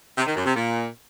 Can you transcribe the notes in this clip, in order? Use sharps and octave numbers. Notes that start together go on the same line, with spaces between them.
C3
D#3
F#2
C3
A#2